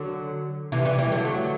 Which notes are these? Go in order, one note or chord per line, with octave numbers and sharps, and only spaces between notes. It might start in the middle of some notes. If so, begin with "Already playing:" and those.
Already playing: D3 F#3
C3 E3
E3 G3
E3 G3
D3 F#3
F#3 A3